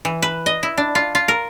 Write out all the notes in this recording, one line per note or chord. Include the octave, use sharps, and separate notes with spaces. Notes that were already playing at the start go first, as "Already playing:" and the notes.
E3
B4
D#5
E4
D4
F4
F4
A#4